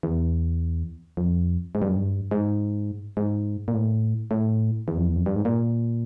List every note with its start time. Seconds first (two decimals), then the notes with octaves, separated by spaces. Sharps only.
0.03 E2
1.17 F2
1.75 G#2
1.82 G2
1.89 F#2
1.96 G2
2.31 G#2
3.17 G#2
3.68 A#2
3.74 A2
4.31 A2
4.88 E2
4.97 F2
5.07 E2
5.16 F2
5.26 G2
5.36 G#2
5.45 A#2